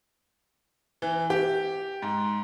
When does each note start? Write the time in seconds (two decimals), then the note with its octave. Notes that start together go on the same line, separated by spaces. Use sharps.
1.02 E3
1.30 G4
2.02 G#2